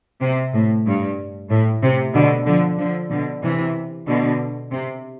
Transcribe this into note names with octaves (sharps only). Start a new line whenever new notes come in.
C3
A2
G2
A2
C3
B2 D3
D3 F3
D3 F3
B2 D3
C3 E3
B2 D3
C3